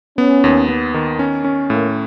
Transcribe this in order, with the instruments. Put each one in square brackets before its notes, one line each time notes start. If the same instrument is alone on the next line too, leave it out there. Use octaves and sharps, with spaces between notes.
[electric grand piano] B3 [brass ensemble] C#4
[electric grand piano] D#2
B3
D#3
C#4
C#4
[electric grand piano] A2 [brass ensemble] A#3